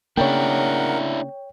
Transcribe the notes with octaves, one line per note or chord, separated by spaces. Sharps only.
C#3 A#3 D4 E4 A#4 C#5 F#5 G5